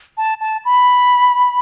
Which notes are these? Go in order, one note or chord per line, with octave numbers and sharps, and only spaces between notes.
A5
A5
B5